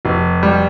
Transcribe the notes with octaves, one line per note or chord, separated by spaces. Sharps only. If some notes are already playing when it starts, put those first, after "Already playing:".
F1
G3